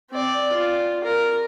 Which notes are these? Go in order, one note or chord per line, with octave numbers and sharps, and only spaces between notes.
C4 D5
F4
A#4